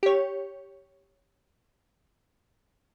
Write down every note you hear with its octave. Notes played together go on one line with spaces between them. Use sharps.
G4 C#5